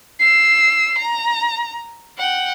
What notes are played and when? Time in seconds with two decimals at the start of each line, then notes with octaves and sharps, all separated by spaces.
0.19 E6 C7
0.98 A#5
2.18 F#5 G5